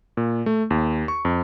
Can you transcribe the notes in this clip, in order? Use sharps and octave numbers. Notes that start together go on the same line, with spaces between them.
A#2
A3
D#2
C#6
F2